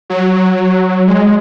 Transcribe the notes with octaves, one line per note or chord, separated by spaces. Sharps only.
F#3
G#3